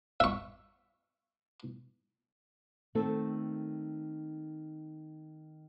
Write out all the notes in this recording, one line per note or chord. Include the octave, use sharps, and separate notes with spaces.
E5 C#6
D#3 A3 C4 A4